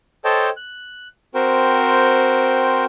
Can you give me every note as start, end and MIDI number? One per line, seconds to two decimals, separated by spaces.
0.25 0.50 69
0.25 0.50 72
0.25 0.50 73
0.25 0.50 75
0.25 0.50 79
0.25 0.50 81
0.57 1.08 90
1.34 2.85 60
1.34 2.85 66
1.34 2.85 70
1.34 2.85 72
1.34 2.85 79